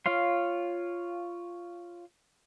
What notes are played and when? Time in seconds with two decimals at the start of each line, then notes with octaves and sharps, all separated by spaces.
0.06 F4 C#5 F5 C6